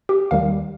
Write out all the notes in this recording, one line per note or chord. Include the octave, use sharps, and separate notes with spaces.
G4
D#2 D#3 G3 F5